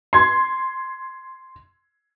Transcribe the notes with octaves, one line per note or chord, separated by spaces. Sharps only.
C6 G#6